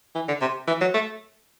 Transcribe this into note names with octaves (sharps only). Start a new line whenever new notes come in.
E3
D3
C3
E3
F#3
A3